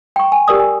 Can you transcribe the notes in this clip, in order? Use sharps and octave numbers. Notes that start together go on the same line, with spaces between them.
G5 C#6
G#5
G4 A#4 D5 D#6
G#5